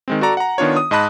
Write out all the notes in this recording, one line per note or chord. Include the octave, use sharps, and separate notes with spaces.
D#3 G#3 C4
F#4 A4 D5 A#5
F#5 A#5
D#3 B3 D4 F4 C#5
D#6
G#2 D#5 A5 B5 F#6